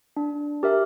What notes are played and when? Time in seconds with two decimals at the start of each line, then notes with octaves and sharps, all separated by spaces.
0.17 D4
0.63 G4 A#4 E5